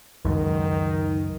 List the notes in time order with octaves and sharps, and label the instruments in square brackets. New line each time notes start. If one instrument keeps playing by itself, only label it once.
[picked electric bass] C#2 F#2 [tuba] D#3